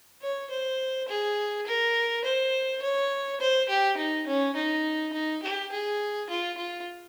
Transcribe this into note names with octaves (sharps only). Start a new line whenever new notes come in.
C#5
C5
G#4
A#4
C5
C#5
C5
G4
D#4
C#4
D#4
D#4
G4
G#4
F4
F4